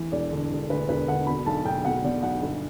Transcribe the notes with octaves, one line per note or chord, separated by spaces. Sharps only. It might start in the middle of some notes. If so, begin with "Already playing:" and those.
Already playing: E3
E1 D5
D3
E1
D2 B4
E1 B4
D3 F#5
B2 B5
B1 A5
B1 G5
B2 F#5
B2 D5
B1 F#5
G1